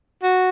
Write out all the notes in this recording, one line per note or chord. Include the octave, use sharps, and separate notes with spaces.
F#4